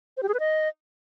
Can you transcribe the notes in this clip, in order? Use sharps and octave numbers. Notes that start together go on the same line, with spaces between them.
C5
G4
G#4
B4
D#5